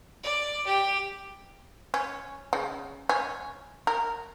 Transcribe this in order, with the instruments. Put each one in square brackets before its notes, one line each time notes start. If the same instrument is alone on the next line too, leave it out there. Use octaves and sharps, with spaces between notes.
[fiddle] D5
G4
[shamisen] C#4
C#3
C#4
A#4